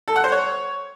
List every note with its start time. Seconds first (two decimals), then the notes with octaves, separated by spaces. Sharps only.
0.08 A4
0.16 F#5
0.24 C5
0.32 C#5